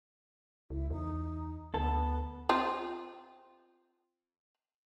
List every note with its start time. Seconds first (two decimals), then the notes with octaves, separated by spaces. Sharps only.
0.70 C#2 E4
0.90 E2 D#4
1.74 D2 B3 A4
2.49 C4 F4